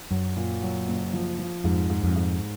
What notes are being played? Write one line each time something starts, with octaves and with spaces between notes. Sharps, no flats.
F#2 F#3
A#2
F#3
F#1
F3
F3
F2 G#2
G#2
F2
G#2